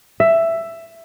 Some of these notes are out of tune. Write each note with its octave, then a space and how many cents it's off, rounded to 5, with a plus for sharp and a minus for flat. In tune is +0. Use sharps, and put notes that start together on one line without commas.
E5 +10